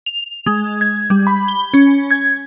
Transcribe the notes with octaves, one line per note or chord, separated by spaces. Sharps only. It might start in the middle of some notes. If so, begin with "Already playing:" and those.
F7
G#3
G#6
G3
B5
G7
C#4
G#6